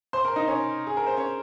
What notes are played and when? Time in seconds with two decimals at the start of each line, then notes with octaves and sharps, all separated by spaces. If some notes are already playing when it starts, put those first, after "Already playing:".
0.13 C5 C6
0.24 A#4 A#5
0.36 D#4 D#5
0.47 C#4 C#5
0.87 G#4
0.97 A#4
1.07 C5
1.17 C#4 C#5